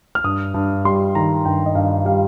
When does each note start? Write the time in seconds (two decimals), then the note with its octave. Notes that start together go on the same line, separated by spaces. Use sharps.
0.15 F6
0.24 G2 D#6
0.54 G2
0.85 G3 C6
1.15 D#3 A#5
1.45 G2 G5
1.66 D#5
1.75 G2 F5
2.05 G3 F5